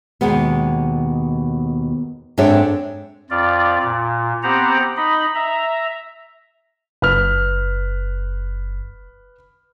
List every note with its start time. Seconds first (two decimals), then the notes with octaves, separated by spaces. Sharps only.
0.21 D#2 B2 G#3 B3
2.38 G#2 C4 D4 A4 C#5 E5
3.30 F2 F4 D5
3.83 A#2
4.43 B3 C4 G4 C5 F#5 A#5
4.97 D#4 D#5 B5
5.35 E5 A#5
7.02 F#1 B4 F6